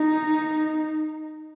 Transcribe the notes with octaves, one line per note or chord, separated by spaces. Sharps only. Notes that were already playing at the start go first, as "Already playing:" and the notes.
Already playing: D#4